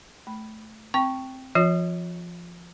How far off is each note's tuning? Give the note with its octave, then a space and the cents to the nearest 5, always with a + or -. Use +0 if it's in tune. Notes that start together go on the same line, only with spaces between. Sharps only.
A3 -10 B5 +0
C4 +0 G5 +0 C#6 +0
F3 -15 F4 +40 C#5 +15